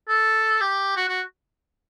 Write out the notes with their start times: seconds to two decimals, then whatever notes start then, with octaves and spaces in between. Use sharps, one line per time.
0.08 A4
0.61 G4
0.97 F#4
1.08 F#4